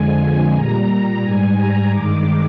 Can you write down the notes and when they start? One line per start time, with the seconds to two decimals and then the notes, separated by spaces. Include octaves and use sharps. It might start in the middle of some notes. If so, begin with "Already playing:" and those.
Already playing: F2 D3 F3 G#3 G#5
0.19 G#5
0.53 A#2 G3 A#5
1.22 G#2 G3 G#5
1.57 A#5
1.91 G2 D#3 G#3 D6